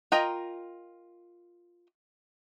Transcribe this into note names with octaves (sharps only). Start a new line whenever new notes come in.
F4 A#4 D#5 G5 A#5